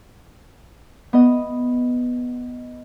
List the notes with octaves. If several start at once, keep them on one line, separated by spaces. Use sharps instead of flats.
B3 D#5